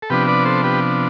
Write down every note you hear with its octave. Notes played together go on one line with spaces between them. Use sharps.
A4
C3 F3 B3 D4 G4 B4
B4 D5
A4 C5
G4 B4